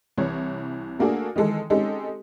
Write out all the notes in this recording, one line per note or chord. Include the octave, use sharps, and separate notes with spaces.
C2 E3 C#5
A3 A#3 D4 F#4 G#4 A4
D#3 E3 G#3 A4
G#3 C4 C#4 D#4 G4 A4